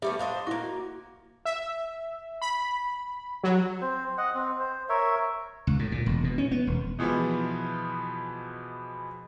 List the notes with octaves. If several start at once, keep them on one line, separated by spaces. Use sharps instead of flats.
G3 A3 B3 E5
D4 C5 D#5 F5
A#3 E4 F#4 C#6
E5
B5
F#3
C4 C5
D#5 F#5
C4
C5
A#4 C#5 E5
C#2
A2
A#2
E1
B2
C#4
B3
E1
B2 E3 F3 G#3 B3